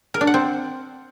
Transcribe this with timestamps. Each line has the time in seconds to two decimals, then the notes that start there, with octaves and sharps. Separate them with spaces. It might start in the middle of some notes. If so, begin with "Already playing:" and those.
0.14 A#4
0.21 D4
0.27 F#5
0.34 C4